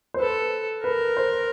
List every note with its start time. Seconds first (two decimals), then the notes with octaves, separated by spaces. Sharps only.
0.14 C5
0.20 A4 B4
0.84 A#4 B4
1.17 C5